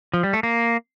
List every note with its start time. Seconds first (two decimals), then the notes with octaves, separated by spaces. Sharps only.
0.13 F3
0.23 G3
0.33 A3
0.43 A#3